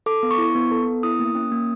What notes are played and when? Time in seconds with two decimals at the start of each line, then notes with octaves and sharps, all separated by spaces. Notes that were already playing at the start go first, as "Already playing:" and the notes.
0.06 A4 D6
0.23 B3
0.31 C#6
0.38 E4
0.55 B3
0.71 A4
0.88 B3
1.03 E4 D#6
1.19 A#3
1.35 C#4
1.52 A#3